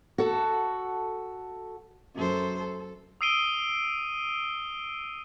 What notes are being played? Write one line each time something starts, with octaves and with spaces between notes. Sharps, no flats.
F#4 A4
F#2 A4 C5
A4
D#6 E6 C7 D7 D#7 G7